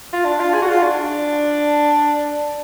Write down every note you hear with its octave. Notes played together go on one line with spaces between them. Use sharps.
F4
D4
F4
G#4
F#4
F4
D4